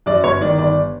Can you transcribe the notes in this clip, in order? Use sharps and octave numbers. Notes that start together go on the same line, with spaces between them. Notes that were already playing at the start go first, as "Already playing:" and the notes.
F#2 D5
G1 C#5
D#3 D5
G1 D5